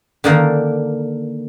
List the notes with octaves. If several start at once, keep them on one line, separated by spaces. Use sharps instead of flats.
D3 D#3 A#3